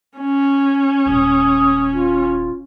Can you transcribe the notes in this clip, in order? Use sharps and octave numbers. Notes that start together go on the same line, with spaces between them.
C#4
D#1 G#3 D#6
F4